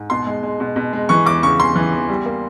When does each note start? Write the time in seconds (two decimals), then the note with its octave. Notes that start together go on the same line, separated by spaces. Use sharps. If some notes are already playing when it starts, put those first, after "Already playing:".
Already playing: G#2
0.10 B2 C6
0.27 G#3
0.43 G#3
0.60 B2
0.76 B2
0.93 G#3
1.09 E3 C#6
1.26 E2 D6
1.43 C#3 C#6
1.59 E2 C6
1.76 E3
1.92 E2
2.09 G3
2.26 A#3